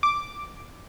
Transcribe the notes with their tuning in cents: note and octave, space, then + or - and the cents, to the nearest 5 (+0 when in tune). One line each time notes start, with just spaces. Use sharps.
D6 +0